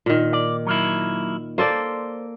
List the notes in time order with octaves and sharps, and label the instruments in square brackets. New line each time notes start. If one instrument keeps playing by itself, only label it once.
[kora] A#2 D#3
[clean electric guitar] D5
F#3 A#3 E4
[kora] A#3 A4 D5 [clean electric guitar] C5